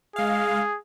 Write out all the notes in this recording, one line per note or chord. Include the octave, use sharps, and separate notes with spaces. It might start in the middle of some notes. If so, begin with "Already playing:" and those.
G#3 G#4 F5